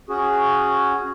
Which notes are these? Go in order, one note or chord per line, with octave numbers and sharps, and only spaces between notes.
C#4 F#4 G#4